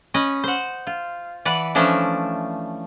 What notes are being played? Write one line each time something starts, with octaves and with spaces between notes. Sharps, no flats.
C#4 B4 D#5
C5 F#5
F4
E3 B4 D5 F#5
E3 F3 A3 C#4 D4